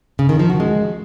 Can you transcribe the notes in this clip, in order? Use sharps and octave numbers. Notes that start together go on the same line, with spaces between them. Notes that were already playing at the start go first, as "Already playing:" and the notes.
C#3
D#3
F3
F#4
G#3